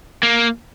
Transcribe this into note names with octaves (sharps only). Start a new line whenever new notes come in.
A#3